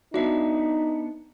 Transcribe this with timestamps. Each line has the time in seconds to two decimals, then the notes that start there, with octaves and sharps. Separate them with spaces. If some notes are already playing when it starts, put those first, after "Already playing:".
0.14 B3 D4 D#4 F#4 E5